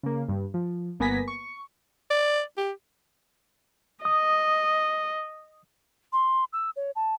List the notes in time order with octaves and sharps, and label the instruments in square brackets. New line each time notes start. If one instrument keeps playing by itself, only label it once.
[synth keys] C#3 A#3
G2
F3
G1 A#3 B3 G#5 A#6 B6
C#6
[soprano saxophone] D5
G4
[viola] D#5 [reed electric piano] D#6
[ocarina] C6
E6
C#5
A5